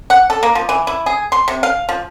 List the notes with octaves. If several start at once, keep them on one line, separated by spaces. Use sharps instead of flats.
F#5
A4
A#3
F3
E3
E4
G#4
C6
C3
F5
F3